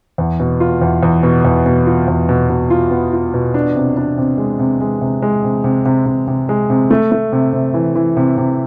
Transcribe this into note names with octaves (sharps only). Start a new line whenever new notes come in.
E2
B2
F4
E2
E2
B2
E2
B2
F4
E2
B2
B2
F4
B3
F4
B2
D4
C3
D4
C3
G#3
C3
G#3
C3
G#3
C3
C3
C3
C3
C3
G#3
C3
A3
A3
C3
C3
E3
E3
C3
C3